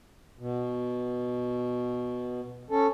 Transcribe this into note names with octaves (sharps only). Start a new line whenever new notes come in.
B2
C#4 A4